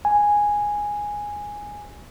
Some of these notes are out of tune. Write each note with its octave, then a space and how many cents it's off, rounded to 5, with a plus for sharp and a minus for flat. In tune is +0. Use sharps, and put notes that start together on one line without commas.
G#5 -5